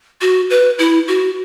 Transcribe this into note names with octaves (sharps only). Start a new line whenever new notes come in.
F#4
B4
E4
F#4